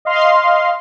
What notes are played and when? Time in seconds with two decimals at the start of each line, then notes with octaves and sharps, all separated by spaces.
0.05 D#5 F5 C6